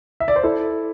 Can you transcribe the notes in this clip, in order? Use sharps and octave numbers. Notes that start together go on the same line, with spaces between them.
E5
D5
C5
E4 A4